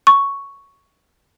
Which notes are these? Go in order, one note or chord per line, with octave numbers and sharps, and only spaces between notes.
C#6